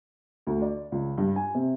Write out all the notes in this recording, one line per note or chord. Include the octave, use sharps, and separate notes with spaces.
D2
D5
C#2
G2
G#5
C3